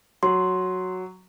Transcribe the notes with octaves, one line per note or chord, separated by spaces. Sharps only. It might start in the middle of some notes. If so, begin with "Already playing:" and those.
F#3 C6